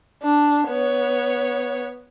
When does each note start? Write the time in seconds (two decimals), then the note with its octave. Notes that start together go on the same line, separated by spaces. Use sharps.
0.23 D4
0.69 B3 C#5